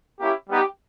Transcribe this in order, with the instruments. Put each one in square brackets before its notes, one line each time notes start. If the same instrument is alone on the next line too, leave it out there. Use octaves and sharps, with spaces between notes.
[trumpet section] A#3 C#4 E4 G4
G3 B3 D#4 G4